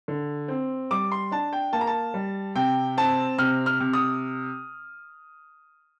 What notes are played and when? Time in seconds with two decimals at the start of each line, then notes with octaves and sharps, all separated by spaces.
0.08 D3
0.48 C4
0.91 G3 D6
1.12 C6
1.32 D4 A5
1.53 G5
1.73 A#3 A5
1.81 A#5
1.87 A5
2.14 G3
2.55 C3 G5
2.97 C4 A5
3.38 C3 F6
3.66 F6
3.80 C3
3.93 D#6